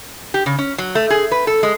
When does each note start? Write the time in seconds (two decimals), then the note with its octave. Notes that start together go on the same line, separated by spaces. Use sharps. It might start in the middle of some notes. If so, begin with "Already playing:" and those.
0.34 G4
0.46 C#3
0.58 C#4
0.78 F#3
0.95 A3
1.10 G#4
1.32 B4
1.47 A4
1.63 G#3